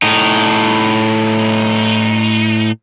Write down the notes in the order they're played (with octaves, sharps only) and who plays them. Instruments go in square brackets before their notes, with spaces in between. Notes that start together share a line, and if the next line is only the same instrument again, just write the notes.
[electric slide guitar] A2 D#4